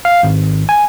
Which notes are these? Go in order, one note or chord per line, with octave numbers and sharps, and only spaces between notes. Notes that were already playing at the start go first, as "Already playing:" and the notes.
F5
G#1
G#5